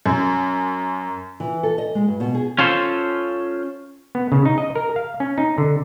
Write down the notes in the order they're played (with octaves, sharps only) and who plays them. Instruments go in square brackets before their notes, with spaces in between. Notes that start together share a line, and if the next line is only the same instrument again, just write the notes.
[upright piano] F#2
[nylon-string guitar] E3
A4
D#5
G#3
G2
B2
G#4
[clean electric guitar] C#4 F4 A4 C5
[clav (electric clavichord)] B3
C#3
D#4
D#5
A#4
F5
C#4
D#4
D3